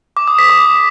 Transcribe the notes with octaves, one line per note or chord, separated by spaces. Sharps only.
D6
D#6
B6
D6